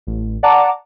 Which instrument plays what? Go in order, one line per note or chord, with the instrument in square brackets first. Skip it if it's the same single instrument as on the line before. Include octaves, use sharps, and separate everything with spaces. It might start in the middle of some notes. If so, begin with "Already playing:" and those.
[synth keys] A1
D5 F#5 A5 A#5 D6